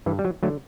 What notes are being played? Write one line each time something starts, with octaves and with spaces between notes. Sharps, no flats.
G2 E3
G3
F#3
D3 F#3 A3